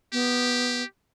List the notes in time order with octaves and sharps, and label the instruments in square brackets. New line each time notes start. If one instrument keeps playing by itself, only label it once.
[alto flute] B3 [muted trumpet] G4